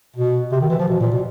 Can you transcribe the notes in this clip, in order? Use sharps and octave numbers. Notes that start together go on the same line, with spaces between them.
B2
C3
D#3
E3
F3
B2
A#2
B2